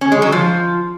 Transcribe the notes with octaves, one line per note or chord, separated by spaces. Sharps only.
C#4
G#3
F#3
F3